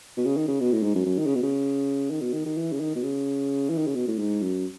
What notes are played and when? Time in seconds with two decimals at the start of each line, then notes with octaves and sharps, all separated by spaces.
0.17 B2
0.25 C#3
0.37 D#3
0.48 C#3
0.61 B2
0.72 A2
0.83 G#2
0.95 F#2
1.06 F#2
1.18 D#3
1.27 C#3
1.35 B2
1.43 C#3
2.10 D#3
2.22 B2
2.33 D#3
2.46 D#3
2.57 E3
2.73 C#3
2.80 D#3
2.95 B2
3.03 C#3
3.70 E3
3.78 D#3
3.87 C#3
3.95 B2
4.08 A2
4.18 G#2
4.42 F#2